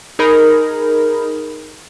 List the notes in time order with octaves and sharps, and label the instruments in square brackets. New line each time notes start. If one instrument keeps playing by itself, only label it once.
[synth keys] D#4 G#4 A#4 B5